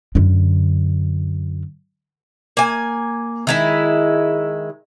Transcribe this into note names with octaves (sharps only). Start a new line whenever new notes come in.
F#2 D3
A#3 G#5
D#3 G#3 E4